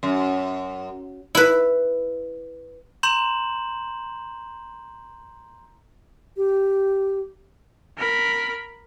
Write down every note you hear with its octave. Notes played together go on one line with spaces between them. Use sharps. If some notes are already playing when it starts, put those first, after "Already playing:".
F#2
E4 B4
A#5 C6 G6 E7 F#7
G4
A#4 B5